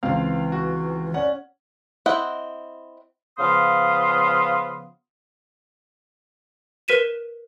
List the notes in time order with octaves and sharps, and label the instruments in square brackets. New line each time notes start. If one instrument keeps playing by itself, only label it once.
[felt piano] C#2 C4 [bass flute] E3 [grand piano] F5
[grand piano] F#4
[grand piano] C#4 [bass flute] D5 [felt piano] F#5
[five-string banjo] C4 E4 D#5 F#5
[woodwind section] C#3 F3 B3 F5 C6 D#6
[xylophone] A#4 B4 B6 D#7 E7